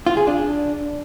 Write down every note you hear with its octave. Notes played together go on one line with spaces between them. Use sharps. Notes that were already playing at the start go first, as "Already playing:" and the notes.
F4
G#4
D4